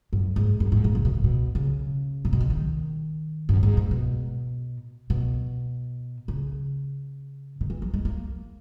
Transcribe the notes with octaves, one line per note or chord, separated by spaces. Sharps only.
F#2
G#2
F#2
G#2
A#2
C#3
B2
A#2
B2
C#3
A#2
B2
C#3
D#3
F#2
G#2
A#2
B2
B2
C#3
D#3
E3
F#3
G#3
A#3